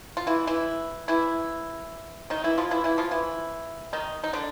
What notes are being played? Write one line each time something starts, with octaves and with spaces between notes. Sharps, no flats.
F4
E3 E4
E3 E4
E3 E4
D#3 D#4
E3 E4
F3 F4
E3 E4
E3 E4
F3 F4
E3 E4
D#3 D#4
D#4
D3 D4